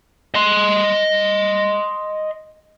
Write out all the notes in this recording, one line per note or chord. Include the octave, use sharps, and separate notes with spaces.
D#5 C6